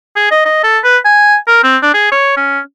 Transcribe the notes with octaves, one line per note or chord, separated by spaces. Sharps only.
G#4
D#5
D#5
A4
B4
G#5
A#4
C4
D4
G#4
C#5
C#4